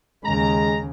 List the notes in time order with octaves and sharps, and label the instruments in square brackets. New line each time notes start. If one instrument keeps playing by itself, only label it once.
[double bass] D#2 C#3 [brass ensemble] G#3 [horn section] A#5